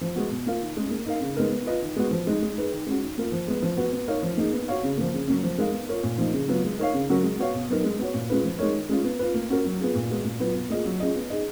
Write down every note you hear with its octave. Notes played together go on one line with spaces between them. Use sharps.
F3
G#3 B3 F#4
B2
A#3 F4 A#4 F5
D#3
G#3 C#4 G#4
A#3
D#4 A#4 F5
C#3
G#3 B3 D#4 A#4
B3
F4 B4 D#5
D#3
G#3 B3 F#4
F3
G#3 D#4
G#3
D#4 G#4 B4
D#3
G#3 C#4 F#4
D#3
A#3 F4 A#4
F3
G#3 B3
F3
B3 F#4 B4
B3
D#4 A#4 C#5 F5
F3
A#3 D#4 G#4
B3
F#4 C#5 F5
C#3
F3 A#3
C#3
F#3 A#3 C#4
F3
G#3 D#4 A#4 F5
B3
F4 A#4 C#5
A#2
F3 A#3 D#4
C#3
F#3 B3 F4
G#3
D#4 A#4 C#5 F5
C#3
F#3 C#4 F#4 A#4
G#3
B3 F#4 C#5 F5
B2
F#3 B3 D#4 A#4
G#3
B3 F#4 C#5
A#2
G#3 C#4 F4 B4
F3
G#3 D#4 A#4 C#5
D#3
G#3 C#4 F4
B3
F4 B4
A#3
C#4 F#4 A#4
F#3
B3 F4 G#4
A#2
G#3 B3 F#4
A#2
F#3 B3 F4 B4
B2
A#3 F4 G#4 D#5
F#3
C#4 F4 G#4 D#5
B3
D#4 G#4 D#5